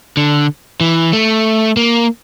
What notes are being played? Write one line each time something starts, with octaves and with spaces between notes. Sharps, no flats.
D3
E3
A3
A#3